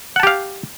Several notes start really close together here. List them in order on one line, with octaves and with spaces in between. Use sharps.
F#5 A5 G4 F5